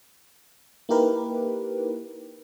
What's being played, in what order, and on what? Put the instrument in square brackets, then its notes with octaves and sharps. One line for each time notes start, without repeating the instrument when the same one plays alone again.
[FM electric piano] A#3 D#4 E4 G4 A#4 B4